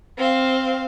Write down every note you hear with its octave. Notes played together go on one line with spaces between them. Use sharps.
C4 F5